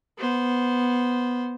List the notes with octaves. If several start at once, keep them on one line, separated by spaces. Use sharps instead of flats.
B3 C5